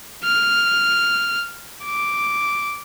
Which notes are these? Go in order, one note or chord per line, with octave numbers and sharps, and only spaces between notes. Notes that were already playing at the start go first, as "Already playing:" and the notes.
F6
D6